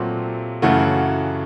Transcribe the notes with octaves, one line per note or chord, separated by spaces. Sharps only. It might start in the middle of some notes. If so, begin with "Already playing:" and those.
Already playing: A#2 F#3 A3 C4 G4
F#2 C#3 E3 A3 F#4
F#4